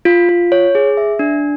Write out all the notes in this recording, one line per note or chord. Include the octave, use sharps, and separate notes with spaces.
F4
F4
C#5
G#4
E5
D4